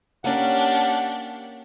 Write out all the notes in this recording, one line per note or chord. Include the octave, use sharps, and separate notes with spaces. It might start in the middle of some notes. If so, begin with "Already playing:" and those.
A#3 C#4 D4 G4 A#4 F#5